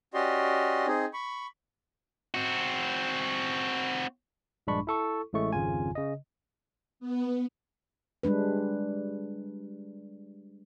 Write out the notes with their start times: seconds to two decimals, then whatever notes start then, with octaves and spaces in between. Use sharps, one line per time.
0.14 C#4 F#4 G4 D5 D#5 C6
0.87 C4 D#4 G#4
1.13 B5 C#6
2.34 C4 F#4
4.67 A#1 G2 G#3 D4 B5 C#6
4.87 E4 A4 C#6
5.33 A1 A2 G#3 A3 C#6
5.53 G#1 F2 C#3 F4 G#5
5.95 C#3 D#5
7.00 B3
8.23 G3 G#3 D4 B4